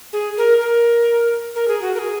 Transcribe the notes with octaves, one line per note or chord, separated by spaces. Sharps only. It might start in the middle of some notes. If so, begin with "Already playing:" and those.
G#4
A#4
A#4
A#4
G#4
F#4
A#4
G#4